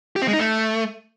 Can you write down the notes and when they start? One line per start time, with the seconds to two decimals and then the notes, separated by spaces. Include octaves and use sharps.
0.16 G4
0.22 C4
0.28 G#3
0.33 D#4
0.39 A3